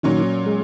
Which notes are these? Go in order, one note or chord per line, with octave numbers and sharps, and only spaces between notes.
A#2 D#3 F#3 C#4
G#3